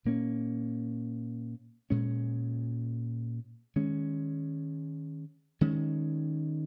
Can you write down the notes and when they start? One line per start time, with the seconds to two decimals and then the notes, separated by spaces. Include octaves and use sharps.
0.05 A#2 A#3 C#4
1.90 A#2 G#3 C#4
3.76 D#3 G#3 C#4
5.61 D#3 G#3 C#4